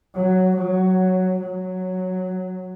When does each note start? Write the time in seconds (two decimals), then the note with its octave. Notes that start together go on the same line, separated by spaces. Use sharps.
0.15 F#3
0.56 F#3
1.40 F#3